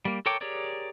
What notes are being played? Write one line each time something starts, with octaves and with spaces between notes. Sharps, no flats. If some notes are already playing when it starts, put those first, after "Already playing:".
G3 A#3
A4 A#4 C#5 G5 D6
G4 G#4 A#4 C#5 D5